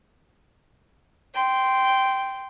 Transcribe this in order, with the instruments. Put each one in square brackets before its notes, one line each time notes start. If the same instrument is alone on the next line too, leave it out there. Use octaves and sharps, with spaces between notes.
[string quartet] G5 C6